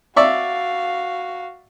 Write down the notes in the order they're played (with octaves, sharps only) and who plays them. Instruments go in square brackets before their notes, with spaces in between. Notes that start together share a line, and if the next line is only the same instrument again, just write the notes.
[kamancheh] F#4 F5 [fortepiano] D5 E5 C#6